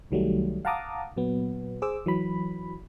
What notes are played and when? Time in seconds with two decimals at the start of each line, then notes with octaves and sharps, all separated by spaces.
0.11 C2 D#3 F#3 G3 A3
0.65 F5 F#5 A5 A#5 D6 D#6
1.16 A#2 F#3 B3
1.82 G#4 C5 D6 E6
2.06 E3 F#3 B5